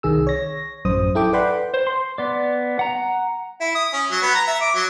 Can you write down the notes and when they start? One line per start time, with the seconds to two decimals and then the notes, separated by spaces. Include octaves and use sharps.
0.03 C2 D#3 G#4 E6
0.27 C#5 A#6
0.85 A1 F#2 C5 D#6
1.15 E4 A4 G5 D6
1.33 B4 D5 F#5 G5 B5 C6
1.74 C5
1.87 C6
2.18 B3 D5
2.79 F#5 A#5
3.61 E4
3.75 D#6
3.93 C#4
4.11 F#3
4.22 B3
4.34 A#5
4.47 E5
4.61 D6
4.75 F#3